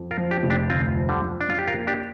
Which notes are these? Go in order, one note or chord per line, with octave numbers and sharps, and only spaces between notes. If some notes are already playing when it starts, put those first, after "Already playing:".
Already playing: F2
F4 A#4
F3
D4 G4
F1
D4 G4
D2 C4 F4
F3
D3 G3
F3
D4
F2 F4
G4
F4 A#4
A#3
D4 G4